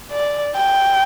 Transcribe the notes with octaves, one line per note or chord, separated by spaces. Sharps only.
D5
G5